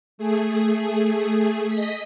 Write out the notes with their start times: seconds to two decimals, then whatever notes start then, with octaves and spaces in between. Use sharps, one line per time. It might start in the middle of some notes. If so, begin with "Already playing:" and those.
0.18 A3 G#4
1.69 D#5 B6